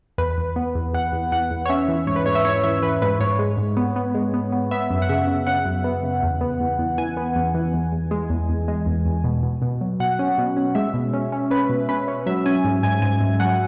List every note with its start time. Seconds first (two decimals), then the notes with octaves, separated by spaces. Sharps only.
0.18 E2 B4
0.38 E2
0.56 B3
0.75 E2
0.94 E2 F#5
1.12 E2
1.32 E2 F#5
1.51 E2
1.66 C#5
1.69 C#4 E5
1.88 E3
2.07 G#2 C#5
2.16 B4
2.26 G#2 C#5
2.35 E5
2.45 C#4 C#5
2.64 E3 E5
2.83 E3 B4
3.02 G#2 B4
3.20 G#2 C#5
3.39 G#3
3.58 G#2
3.77 B3
3.96 B3
4.15 G#3
4.34 B3
4.52 B3
4.71 B3 E5
4.90 F#2
5.02 F#5
5.09 C#3 E5
5.27 C#3
5.47 C#3 F#5
5.66 F#2
5.84 B3
6.03 C#3
6.23 E2
6.41 B3
6.60 E2
6.79 E2
6.98 E3 G#5
7.17 B3
7.36 E2
7.54 E3
7.74 E2
7.92 E2
8.11 G#3
8.30 E2
8.49 E2
8.68 G#3
8.86 E2
9.06 E2
9.24 B2
9.43 B2
9.62 B2
9.81 F#3
10.00 B2 F#5
10.19 C#4
10.38 B2
10.57 C#4
10.75 G#3 E5
10.94 B2
11.13 C#4
11.32 C#4
11.51 C#4 B4
11.69 B2
11.89 C#4 B4
12.08 C#4
12.26 F#3 E5
12.46 C#4 G#5
12.64 G#2
12.83 G#2 G#5
13.02 G#2 G#5
13.21 G#2
13.40 F#3 F#5